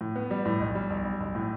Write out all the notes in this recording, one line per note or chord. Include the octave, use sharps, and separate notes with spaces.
A2
B3
G3
A2
B1
G3
B1
G3
B1
A2